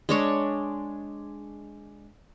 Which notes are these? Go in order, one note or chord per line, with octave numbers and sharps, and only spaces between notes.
G#3 D4 C#5